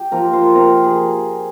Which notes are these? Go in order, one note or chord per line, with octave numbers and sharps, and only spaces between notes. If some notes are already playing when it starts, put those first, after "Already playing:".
Already playing: G4
F3 A#3 A#4
C5
C3 A#4
G#4